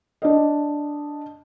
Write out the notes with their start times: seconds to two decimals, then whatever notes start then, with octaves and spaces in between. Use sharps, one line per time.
0.22 D4 D#5